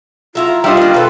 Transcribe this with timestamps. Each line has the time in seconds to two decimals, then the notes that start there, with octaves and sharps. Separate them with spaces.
0.35 F#3 E4 F4 A#5
0.64 G3 D4 E4 F4 C5 D#5 F5
0.77 D#3 A#3
0.94 B2 A4 B4